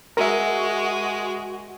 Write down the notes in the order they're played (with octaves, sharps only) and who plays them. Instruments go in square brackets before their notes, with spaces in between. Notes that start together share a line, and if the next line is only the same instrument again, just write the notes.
[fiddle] G#3 [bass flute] F#4 [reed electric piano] A#4 E5